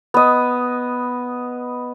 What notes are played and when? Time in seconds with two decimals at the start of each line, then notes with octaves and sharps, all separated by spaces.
0.14 B3 D#5